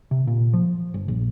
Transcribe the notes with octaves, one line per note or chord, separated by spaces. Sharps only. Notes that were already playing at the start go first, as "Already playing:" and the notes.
C3
A#2
F3
G1
A#1